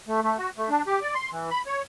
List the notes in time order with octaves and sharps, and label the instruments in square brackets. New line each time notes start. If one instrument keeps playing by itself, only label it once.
[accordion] A3
A3
F#4
A3
D4
G4
D5
C6
E3
B5
C#5